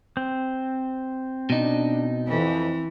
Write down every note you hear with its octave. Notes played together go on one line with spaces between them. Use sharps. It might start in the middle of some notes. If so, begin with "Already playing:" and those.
C4
B2 D4 D#4
F2 E3